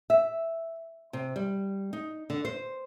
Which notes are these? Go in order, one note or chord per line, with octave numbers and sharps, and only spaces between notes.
E5
C3
G3
D#4
D3
C5